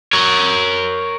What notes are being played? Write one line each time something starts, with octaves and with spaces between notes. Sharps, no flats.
A#4 C#5